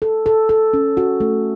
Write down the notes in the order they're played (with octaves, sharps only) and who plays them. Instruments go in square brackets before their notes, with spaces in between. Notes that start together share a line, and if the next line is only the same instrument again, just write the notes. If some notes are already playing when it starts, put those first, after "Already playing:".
[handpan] A4
A4
A4
C#4
F#4
A3